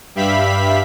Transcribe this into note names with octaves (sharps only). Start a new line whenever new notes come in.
G2 G4 E5 F5 B5 B6